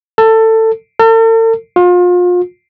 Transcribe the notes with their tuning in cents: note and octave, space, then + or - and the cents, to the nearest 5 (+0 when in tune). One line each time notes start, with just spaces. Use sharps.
A4 +20
A4 +45
F4 +35